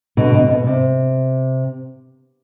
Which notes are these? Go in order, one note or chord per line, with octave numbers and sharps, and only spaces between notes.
B2 D3
B2
C3
B2
C3